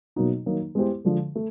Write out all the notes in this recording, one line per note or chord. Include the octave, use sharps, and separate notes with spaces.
B2 F#3 A#3 D#4 F#4
D#3 F#3 A#3 D#4
G#3 B3 E4 G4 C5
D3 F3 G#3
A3